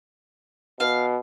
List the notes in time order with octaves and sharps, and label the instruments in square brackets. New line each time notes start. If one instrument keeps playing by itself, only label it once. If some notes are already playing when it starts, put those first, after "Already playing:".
[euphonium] B2 [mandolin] F5